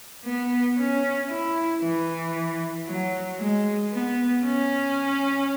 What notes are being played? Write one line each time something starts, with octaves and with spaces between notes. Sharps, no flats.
B3
C#4
E4
E3
F#3
G#3
B3
C#4